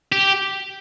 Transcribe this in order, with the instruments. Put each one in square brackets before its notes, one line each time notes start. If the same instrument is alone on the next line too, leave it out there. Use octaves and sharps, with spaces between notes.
[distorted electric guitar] G4